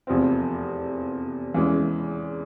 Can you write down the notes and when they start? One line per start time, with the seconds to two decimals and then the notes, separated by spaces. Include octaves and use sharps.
0.07 F1 E2 C3 F3 C4
1.54 E2 E3 G#3 C#4